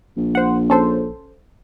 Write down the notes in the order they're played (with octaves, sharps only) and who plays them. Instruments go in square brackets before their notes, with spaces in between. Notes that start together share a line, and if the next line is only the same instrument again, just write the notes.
[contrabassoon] A#1
[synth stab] C5 F#5
C#4 A4 C5